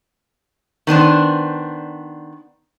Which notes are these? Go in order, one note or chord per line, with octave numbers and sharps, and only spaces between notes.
D#3 B3 D4 C5